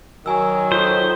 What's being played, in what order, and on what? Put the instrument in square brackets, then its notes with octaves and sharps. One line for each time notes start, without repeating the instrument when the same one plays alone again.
[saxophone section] D#3 F#3 [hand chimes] G#5 E6
[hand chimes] F4 A4 [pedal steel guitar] C5